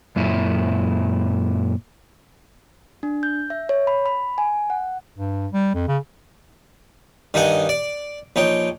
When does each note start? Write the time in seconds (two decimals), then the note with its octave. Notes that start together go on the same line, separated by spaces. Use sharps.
0.16 F#2 A#2 E4
3.03 D4
3.23 G6
3.50 E5
3.69 C#5
3.87 B5
4.06 B5
4.38 G#5
4.70 F#5
5.18 G2
5.53 G3
5.74 F2
5.88 C#3
7.34 G2 D#3 D#4 D#5 F#5 G#5
7.69 D5
8.36 A#1 D#4 C#5 G5